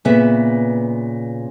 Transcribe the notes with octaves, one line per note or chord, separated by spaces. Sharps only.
A#2 C#3 B3 E5